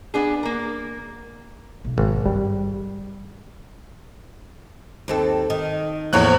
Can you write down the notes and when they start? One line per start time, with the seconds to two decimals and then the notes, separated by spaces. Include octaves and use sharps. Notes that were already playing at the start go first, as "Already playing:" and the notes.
0.14 B3 D4 G#4
0.43 A#3 A#4
1.84 B1
1.98 G#1
2.26 G2 G3
5.08 D#2 C4 A4
5.50 D#3
6.13 E2 A2 F3 A#3 C#5 F#6